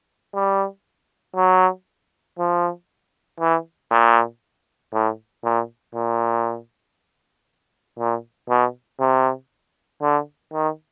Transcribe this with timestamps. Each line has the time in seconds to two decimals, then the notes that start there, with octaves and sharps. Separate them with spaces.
0.35 G3
1.36 F#3
2.39 F3
3.40 E3
3.91 A#2
4.93 A2
5.44 A#2
5.95 A#2
7.99 A#2
8.49 B2
9.00 C3
10.02 D3
10.53 D#3